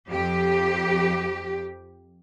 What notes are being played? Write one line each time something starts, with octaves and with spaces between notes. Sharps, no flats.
F2 G4